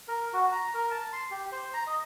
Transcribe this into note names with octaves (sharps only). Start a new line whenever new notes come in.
A#4
F#4
A#5
A#4
A5
C6
G4
C5
A#5
D#5